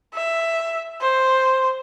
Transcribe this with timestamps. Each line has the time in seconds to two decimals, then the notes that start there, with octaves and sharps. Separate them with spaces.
0.15 E5
1.01 C5